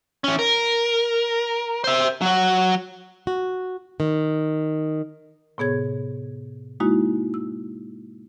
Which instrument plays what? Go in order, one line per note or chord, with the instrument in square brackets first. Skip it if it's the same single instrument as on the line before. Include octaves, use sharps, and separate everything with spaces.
[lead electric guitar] E3 C#4
A#4
C5 E5
F#3 F#4
[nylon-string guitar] F#4
D#3
[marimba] A2 C3 B3 G#4 C#5 G#6
G#3 A#3 D#4 E4 F#4
E6